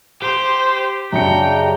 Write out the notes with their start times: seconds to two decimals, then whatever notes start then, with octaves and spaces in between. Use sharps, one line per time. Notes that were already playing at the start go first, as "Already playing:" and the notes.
0.22 G4 C5
1.13 F#2 C#3 D4 G5 A#5 C#7